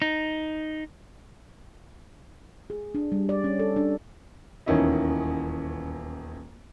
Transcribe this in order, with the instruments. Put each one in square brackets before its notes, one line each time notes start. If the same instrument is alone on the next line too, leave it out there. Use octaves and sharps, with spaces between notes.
[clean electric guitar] D#4
[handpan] G#4
D4
G3
D5
C#4
A4
D4
[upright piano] D#1 E2 D#3 C#4 E4 D#5